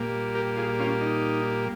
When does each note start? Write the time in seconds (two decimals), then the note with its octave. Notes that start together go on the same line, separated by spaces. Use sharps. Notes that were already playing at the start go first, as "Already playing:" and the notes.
Already playing: A#2 G3 A#3
0.35 G4 A#4
0.56 F4 G#4
0.79 C#4 F4
1.01 D#4